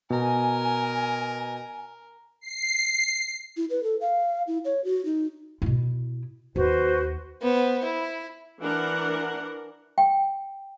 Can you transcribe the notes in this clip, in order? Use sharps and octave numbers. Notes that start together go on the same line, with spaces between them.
B2 A#4 G#5
C7
E4
B4
A4
F5
E4
C#5
F#4
D#4
B2 E4
D#2 F#4 B4 C5
B3 C5
E4
E3 D4 A#4 F#5
G5